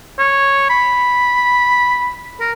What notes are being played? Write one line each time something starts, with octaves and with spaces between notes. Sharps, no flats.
C#5
B5
A#4